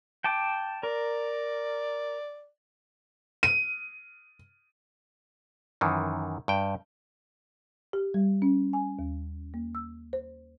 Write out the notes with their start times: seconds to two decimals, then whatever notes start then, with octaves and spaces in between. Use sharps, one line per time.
0.24 G5 A5 D6
0.83 A#4 D5
3.43 D#7
5.81 F#2 D#3 E3
6.48 G2 G5
7.93 G4
8.14 G3
8.42 C#4
8.73 G#5
8.99 D#2
9.54 A#3
9.75 E6
10.13 C5